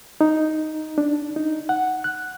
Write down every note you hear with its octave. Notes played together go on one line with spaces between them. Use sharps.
D#4
D4
D#4
F#5
F#6